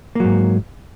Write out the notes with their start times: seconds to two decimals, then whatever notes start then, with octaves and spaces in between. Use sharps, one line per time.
0.15 A#3
0.20 F#3
0.25 G#2